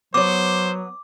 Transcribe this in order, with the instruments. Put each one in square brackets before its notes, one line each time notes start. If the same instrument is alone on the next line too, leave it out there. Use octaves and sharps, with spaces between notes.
[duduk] F#3 [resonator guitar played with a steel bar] B3 C#5 [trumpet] C5 [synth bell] D6